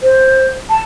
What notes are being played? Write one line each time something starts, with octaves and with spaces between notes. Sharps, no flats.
C5
A5